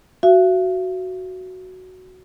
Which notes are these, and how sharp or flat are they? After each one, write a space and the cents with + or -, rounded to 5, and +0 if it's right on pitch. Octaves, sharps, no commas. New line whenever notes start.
F#4 +0 E5 +45